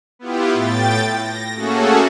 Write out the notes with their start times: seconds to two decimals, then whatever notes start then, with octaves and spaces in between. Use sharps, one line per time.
0.19 B3 E4 F4 G4
0.53 A2 G5 A6
1.19 A#6
1.56 A3 A#3 C#4 F#4 G#4 A4